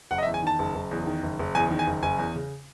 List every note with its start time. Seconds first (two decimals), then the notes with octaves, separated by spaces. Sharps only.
0.11 F#1 F#5
0.18 D#5
0.23 E5
0.26 E2
0.34 G#5
0.42 D#3 A5
0.59 F#1
0.75 F#1
0.91 E2
1.06 D#3
1.23 F#1
1.39 F#1
1.55 E2 G#5
1.71 D#3
1.79 G#5
1.87 F#1
2.03 F#1 G#5
2.18 E2
2.36 C#3